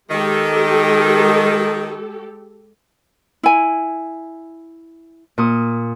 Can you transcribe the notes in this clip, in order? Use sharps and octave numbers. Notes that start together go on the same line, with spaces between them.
D#3 G#3 G4 A4
E4 G#5
A#2 D#6